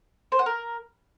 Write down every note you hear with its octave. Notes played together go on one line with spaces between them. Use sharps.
C5
F#5
A#4